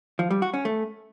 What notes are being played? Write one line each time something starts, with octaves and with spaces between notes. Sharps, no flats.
F3
G3
F#4
C#4
A3